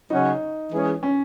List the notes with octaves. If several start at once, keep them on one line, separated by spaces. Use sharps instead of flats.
C#3 F#3 C#4 D#4 F#4
E3 G#3 C#4 G#4
C#4